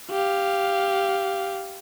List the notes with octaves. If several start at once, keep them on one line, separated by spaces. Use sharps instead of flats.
G4 F5